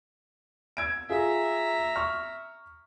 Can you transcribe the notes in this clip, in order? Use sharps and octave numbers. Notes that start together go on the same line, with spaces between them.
E6 G#6 D7
F4 G#4 E5 A#5
C#6 F6